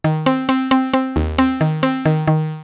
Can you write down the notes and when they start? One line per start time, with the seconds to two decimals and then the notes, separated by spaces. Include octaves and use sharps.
0.04 D#3
0.26 C4
0.49 C4
0.71 C4
0.94 C4
1.16 D#2
1.38 C4
1.61 D#3
1.83 C4
2.06 D#3
2.28 D#3